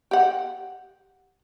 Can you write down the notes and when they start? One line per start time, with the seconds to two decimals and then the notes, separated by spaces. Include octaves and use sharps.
0.11 G4 F#5